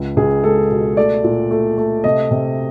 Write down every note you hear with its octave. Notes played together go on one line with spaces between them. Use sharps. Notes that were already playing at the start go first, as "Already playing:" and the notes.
Already playing: C#2
C#2 G#4
G#3 A4
B2
A3 D5
A#2
A3
A3
C3 D#5
C3